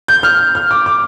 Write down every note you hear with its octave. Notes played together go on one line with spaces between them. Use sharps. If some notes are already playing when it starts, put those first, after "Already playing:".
G6
F6
F6
D6
D6